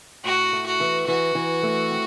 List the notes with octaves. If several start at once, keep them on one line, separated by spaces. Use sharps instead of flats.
A2 F#4
A3
F#4
E3
E3 F#4
E3
A3
C4